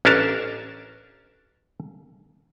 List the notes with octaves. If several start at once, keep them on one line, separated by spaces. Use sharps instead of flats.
A1 C#4 D4 A#4 A5